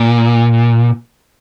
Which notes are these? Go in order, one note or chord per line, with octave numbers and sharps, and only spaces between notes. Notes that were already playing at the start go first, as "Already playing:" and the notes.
Already playing: A#2